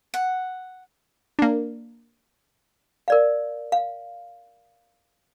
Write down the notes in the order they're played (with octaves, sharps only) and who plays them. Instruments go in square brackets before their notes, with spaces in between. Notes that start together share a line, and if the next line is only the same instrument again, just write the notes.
[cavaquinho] F#5
[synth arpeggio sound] A#3 D4
[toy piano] A#4 D5 F5
F5